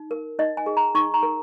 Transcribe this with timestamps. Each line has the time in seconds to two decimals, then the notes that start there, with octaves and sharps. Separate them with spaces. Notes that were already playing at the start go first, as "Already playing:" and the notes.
Already playing: D#4
0.11 A#4
0.39 D#4 D#5
0.57 G#5
0.66 G#4
0.77 A#5
0.95 D#4 C#6
1.14 A#5
1.23 A#4